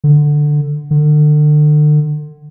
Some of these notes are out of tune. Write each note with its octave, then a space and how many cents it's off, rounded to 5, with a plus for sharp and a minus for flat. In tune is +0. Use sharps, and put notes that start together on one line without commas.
D3 +10
D3 +35